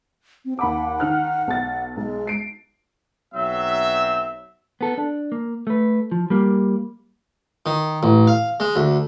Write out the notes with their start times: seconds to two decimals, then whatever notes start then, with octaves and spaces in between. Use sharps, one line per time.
0.45 C4
0.59 D#2 F#5 B5 D6
1.00 D#3 F6 F#6
1.48 B1 A6
1.97 B1 G#3
2.27 C7 D7
3.35 B1 F#3 C4 E5
4.81 B3 A4
4.98 D4
5.32 A#3
5.67 A3 B4
6.12 F3
6.30 G3 A#3
7.66 D#3
8.03 A1
8.27 F5
8.60 G#3
8.76 D2